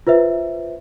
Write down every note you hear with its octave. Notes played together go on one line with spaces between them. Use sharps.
F4 B4 C5 E5